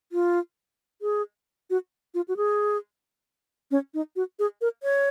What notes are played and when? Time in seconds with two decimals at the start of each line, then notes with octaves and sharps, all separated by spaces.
0.12 F4
1.02 G#4
1.70 F#4
2.14 F4
2.28 F#4
2.37 G#4
3.71 C#4
3.94 D#4
4.16 F#4
4.39 G#4
4.61 A#4
4.83 C#5